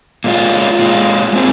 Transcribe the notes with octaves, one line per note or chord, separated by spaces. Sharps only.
A#2 G#3 F4
A#2 G#3 F4
G#3 C4 G#4